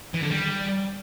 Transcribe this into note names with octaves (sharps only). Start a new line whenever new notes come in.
E3
D3
G3